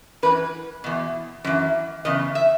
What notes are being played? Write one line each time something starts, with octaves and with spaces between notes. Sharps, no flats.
F#2 E3 B4
E2 B2
F#2 E3
E2 C#3 D#5
E5